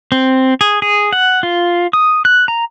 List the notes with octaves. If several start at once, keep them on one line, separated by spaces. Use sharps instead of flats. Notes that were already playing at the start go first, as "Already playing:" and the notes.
C4
G#4
G#4
F#5
F4
D#6
F#6
A#5